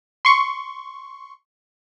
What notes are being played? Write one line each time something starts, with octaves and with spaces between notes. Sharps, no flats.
C6 C#6